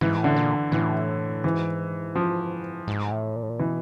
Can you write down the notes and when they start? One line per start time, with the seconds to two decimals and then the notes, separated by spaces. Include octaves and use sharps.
0.01 G#2 E3
0.18 A2
0.24 D3
0.36 A#2
0.72 A2 E3
1.44 G#2 E3
2.15 F3
2.88 G#2
3.11 A2
3.36 A#2
3.43 A2
3.49 A#2
3.59 B2 E3